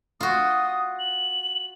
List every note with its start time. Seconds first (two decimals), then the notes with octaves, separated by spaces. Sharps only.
0.21 F4 F#4 D#6
0.99 F#7